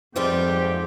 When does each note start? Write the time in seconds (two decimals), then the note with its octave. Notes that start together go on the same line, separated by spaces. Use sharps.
0.16 F2 G#2 G3 C4 F4 G4